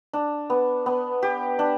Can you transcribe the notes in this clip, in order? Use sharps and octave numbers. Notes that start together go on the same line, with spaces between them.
D4
B3
B3
G4
D4